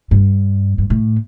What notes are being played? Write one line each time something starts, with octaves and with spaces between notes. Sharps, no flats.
G2
G2
A2